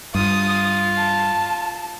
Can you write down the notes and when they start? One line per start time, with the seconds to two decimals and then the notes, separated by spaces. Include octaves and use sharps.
0.15 G2 F4 D#6
0.98 A5